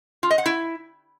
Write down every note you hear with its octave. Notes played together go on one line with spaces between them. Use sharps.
F4
D#5
F#5
E4